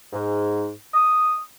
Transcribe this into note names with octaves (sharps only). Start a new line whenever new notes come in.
G#2
D#6